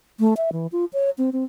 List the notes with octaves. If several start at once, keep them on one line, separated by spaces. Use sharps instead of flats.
A3
E5
E3
F4
C#5
C4
C4